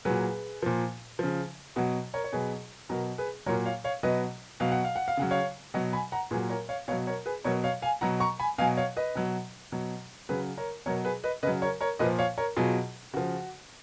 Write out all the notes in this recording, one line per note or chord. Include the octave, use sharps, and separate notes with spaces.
A#2 F#3 G#4 B4
A#2 F3
C#3 F3
B2 F#3 F#4
A#4 C#5
C#5
B2 F#3 G#4 B4
B2 F#3 F#4 A#4
G#4 B4
A#2 F#3 A#4 C#5
C#5 F5
C#5 F5
B2 F#3 B4 D#5
B2 F#3 F5
F#5
F5
F#5
F5
C#3 F#3 F#5
C#5 F5
B2 F#3 D#5 F#5
G#5 B5
F#5 A#5
A#2 F#3 G#4 B4
A#4 C#5
C#5 F5
B2 F#3 C#5 F5
A#4 C#5
G#4 B4
B2 F#3 A#4 C#5
C#5 F5
F5 G#5
B2 F#3 F#5 A#5
A#5 C#6
G#5 B5
B2 F#3 F5 G#5
C#5 F5
B4 D#5
B2 F#3
B2 F#3
C#3 F#3 G#4 B4
A#4 C#5
B2 F#3 A#4 C#5
G#4 B4
B4 D#5
C#3 F#3 B4 D#5
A#4 C#5
A#4 C#5
A#2 F3 B4 D#5
C#5 F5
A#4 C#5
B2 F#3 F4 G#4
C#3 F3 F#4